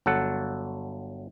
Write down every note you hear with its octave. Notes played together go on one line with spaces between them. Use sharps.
G1 F#3 A4 F#5